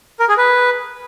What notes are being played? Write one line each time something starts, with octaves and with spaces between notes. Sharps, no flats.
A#4
G#4
B4